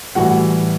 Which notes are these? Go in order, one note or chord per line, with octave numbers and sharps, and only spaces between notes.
A2 E3 G3 F#4 F#5